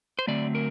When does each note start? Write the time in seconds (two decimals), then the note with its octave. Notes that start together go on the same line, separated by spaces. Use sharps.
0.19 C5
0.27 D3 F#3 A3 C4 D5
0.55 A#4